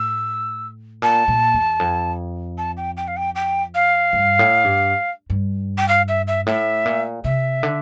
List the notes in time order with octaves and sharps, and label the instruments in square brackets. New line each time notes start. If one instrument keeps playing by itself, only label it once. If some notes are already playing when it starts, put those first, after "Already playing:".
Already playing: [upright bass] A2 [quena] E6
[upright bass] A#2 [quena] A5
[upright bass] A#2
E2
F2
[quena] A5
G5
G5
F5
G5
G5
F5
[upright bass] G2
A2
G2
G2
[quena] G5
F5
E5
E5
[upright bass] A2 [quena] E5
[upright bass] A#2
[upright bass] C3 [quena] E5
[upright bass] D3